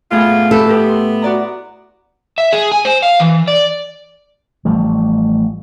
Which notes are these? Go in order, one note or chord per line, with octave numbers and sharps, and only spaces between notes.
A2 B3 F4 G#4
E4 G4 A4 B4
B3 G4
C6
F#4 D5 A#5
E5
G#4
G#5
C5
F5
E3
D5
A1 F3 G3